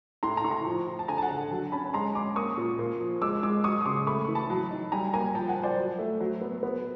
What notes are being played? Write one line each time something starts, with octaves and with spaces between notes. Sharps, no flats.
A2 A#5 C6
A#5 C6
A2 C#6
A#5 C6
F3
F3
A5
D3 G#5 A#5
A5
F#5 G#5
D3
F#3
C#4 A5 B5
G#3 A#5 C6
C#4 C6 D6
A#3 C#6 D#6
A#2
A#3
F3
G#3 D6 E6
G#3 D6 E6
F#3 C#6 D#6
D#6
C#3 C6 D6
A3 B5 C#6
E3
A5 B5
F#3
D#4
G3 G#5 A#5
A#3 G#5 A#5
F3 G5 A5
F#5 G#5
F3
C5 D5
F#3
A3
F#3
B3
B3